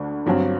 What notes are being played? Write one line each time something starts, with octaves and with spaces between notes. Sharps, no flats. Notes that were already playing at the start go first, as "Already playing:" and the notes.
Already playing: D2 D3 A3 D4
G1 G2 F#3 C4